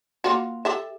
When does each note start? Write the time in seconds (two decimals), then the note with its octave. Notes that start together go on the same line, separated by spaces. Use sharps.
0.24 A#3 F4 F#4
0.65 G4 A4 E5